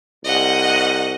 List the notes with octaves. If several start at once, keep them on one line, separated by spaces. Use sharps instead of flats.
C2 D#5 F#5